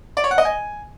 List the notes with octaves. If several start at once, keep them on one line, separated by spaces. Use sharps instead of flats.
D5
C#5
F#5
D#5
G#5